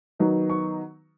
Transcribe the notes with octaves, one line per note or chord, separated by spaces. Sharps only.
D#3 F#3 B3 D#4
C#6